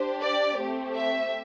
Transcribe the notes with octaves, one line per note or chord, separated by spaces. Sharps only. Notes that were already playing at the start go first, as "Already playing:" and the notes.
Already playing: D4 G4 C5
D5
A3 C4 G4
E5